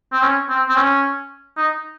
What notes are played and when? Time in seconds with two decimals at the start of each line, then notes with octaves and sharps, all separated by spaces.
0.13 C4
0.22 C#4
0.49 C4
0.69 C4
0.76 C#4
1.57 D#4